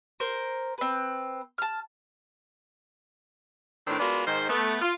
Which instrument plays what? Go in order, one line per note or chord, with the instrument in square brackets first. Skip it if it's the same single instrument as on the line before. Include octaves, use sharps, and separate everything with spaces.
[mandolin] A#4 C5
C4 B4
A5 F6
[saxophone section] A2 D#3 C4 D4
G#3 B3 D4 F4 F#4 A#4
G#2 D#3 C5
A3 B3
F4